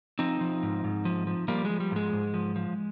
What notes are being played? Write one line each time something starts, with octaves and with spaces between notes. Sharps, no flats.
F3 C4 D#4
F3
G#2
G#2
F3
F3
F3 G3 A#3
F3 G#3
G3
G#2 G#3
G#2
F3
F3